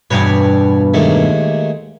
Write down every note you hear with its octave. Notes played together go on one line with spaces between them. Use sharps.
E2 G2 B2 C#5 D5
D#2 G#3 A3